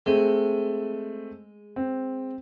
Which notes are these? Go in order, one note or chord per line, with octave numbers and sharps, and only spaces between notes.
G#3 A3 C4
C4